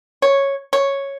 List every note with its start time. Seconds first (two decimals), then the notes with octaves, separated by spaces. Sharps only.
0.22 C#5
0.73 C#5